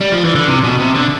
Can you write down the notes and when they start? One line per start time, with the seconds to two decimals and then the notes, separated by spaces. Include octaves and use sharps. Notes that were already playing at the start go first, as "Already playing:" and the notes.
0.01 G3
0.12 F3
0.24 E3
0.35 D3
0.47 C3
0.64 B2
0.80 C3
0.95 D3